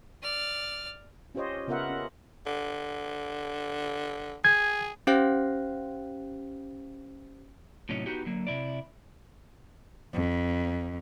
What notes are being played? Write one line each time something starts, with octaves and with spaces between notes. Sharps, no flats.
D5 F6
C#4 F4 G4 C5 C#5 D#5
C#3 B3 F4 A#4 E5 F#5
C#4
D3
G#4 G#6
C#4 G4 C5 F5 G5 F#6
A2 C3 F#3 C#4 D#4
B3 D#4 F#4 G4
D3 F#3 A#3
C3 E4 D5
F2